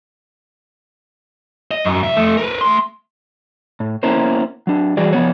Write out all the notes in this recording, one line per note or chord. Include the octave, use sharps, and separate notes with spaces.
D#5
F#2
C2 E5
F2 A3
A#4 B4
A3 C6
A2
A#3 B3 C#4 E4 A#4 C5
F#3 D4
E3 G3 F#4 G#4 D5
F3 B3 C#5